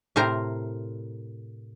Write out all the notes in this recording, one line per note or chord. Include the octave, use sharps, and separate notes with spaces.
A2 C3 A#4 C5 A#5